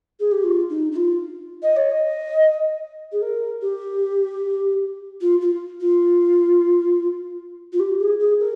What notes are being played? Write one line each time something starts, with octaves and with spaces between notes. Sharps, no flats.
G#4
G4
F4
D#4
D#4
F4
D#5
C#5
D#5
G#4
A#4
G4
F4
F4
F4
F4
G4
G#4
G#4
A#4